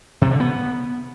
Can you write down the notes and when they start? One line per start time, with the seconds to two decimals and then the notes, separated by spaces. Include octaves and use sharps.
0.22 C3
0.31 D3
0.40 B3